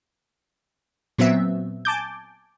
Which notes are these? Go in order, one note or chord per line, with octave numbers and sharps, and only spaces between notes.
A#2 F#3 B3 C4 E5
G#5 A5 D6 G6